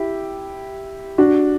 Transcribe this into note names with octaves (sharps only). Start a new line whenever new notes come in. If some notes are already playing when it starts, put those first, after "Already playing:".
Already playing: E4 G4
D4 F#4